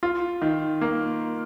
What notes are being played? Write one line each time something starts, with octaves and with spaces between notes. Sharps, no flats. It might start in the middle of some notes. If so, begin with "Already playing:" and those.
F4
D#3
A#3